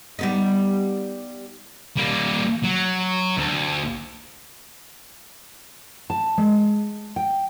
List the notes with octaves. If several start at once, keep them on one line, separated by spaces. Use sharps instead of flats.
G3 B3 D#4
G3 A#3
F#3
D2
A5
G#3
G5